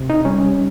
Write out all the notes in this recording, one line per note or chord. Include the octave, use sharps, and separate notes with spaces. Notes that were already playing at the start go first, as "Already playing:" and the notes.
Already playing: C3
D#4
G3 C#4